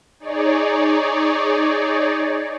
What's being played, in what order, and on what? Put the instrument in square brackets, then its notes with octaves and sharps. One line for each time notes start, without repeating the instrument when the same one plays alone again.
[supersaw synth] D#4 G#4 C#5 D5